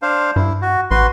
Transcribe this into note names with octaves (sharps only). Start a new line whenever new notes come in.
D4 C5 F5
G2 E4
F#4
A1 F#4 B4 C6